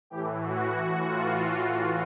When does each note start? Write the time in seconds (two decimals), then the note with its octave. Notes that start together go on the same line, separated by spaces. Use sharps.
0.10 A2 E3 G4
0.41 F#4
0.73 F#4
1.04 F4